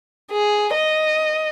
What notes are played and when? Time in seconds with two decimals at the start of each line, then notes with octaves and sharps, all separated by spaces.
0.31 G#4
0.74 D#5